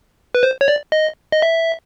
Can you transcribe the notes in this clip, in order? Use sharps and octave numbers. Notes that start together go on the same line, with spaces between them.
B4
C5
C#5
D5
D#5
D#5
E5